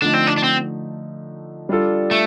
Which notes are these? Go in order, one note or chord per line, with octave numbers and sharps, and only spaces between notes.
D3 F3 A3 D4 D#4
C4
D4
D4
C4
G3 D4 F4 A4
A3